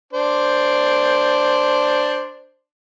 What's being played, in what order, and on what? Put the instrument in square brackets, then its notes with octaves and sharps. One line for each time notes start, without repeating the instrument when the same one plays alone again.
[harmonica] D4 C5